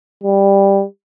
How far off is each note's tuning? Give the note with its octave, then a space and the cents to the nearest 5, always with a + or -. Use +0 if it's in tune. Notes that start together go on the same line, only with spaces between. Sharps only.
G3 +10